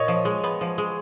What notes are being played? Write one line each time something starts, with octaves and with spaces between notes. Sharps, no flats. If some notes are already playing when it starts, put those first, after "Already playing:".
Already playing: A#2 C#5 D#5
F3
G#3
B3
F3
G#3